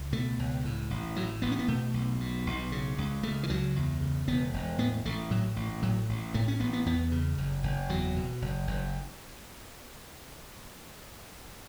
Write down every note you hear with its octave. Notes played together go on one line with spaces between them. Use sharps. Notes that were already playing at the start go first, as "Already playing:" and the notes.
Already playing: C#2
B2 A3
C#2
A2
A1
A2 F#3
A1 B3
C#4
B3
B2 A3
B1
B2
B1
C#3
C#2
C#3 A3
E3
C#2 F#3
E2
C#3
E1 B3
E1
A2 B3
A1 A3
A2 F#3
A1
A2 F#3
A1
A2 A3
C#4
A1 B3
B3
E2 B3
C#3
F#1
F#1
E2 F#3
B2
F#1
F#1